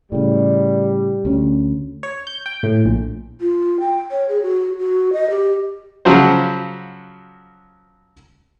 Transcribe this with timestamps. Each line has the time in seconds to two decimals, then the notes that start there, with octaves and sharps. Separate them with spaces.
0.12 A2 C#3 G3
1.25 D2 C#4
2.03 C#5
2.27 G6
2.46 G5
2.63 A2
2.85 A#1
3.41 F4
3.80 G5
4.11 C#5
4.29 G#4
4.43 F#4
4.79 F#4
5.13 D#5
5.30 G4
6.05 C#3 F3 F#3 F#4 C5